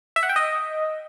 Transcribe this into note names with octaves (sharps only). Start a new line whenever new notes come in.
E5
F#5
G5
D#5